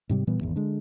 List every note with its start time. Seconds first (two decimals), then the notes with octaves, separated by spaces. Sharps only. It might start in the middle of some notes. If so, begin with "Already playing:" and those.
0.09 G#2 C3 G3
0.27 A#2 E3 G3 B3
0.41 G#1 E2
0.56 D3 G#3